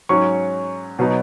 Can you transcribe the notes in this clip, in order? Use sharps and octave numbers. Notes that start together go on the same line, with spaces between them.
G#2 F#3 C#4 C#6
B2 F#3 B3 D#4